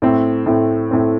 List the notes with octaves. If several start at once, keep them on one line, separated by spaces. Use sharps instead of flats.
A2 A3 C4
A2 A3 C4
A2 A3 C4